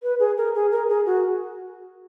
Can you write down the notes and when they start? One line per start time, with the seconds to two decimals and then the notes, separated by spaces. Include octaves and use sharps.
0.03 B4
0.20 G#4
0.37 A#4
0.55 G#4
0.71 A#4
0.89 G#4
1.06 F#4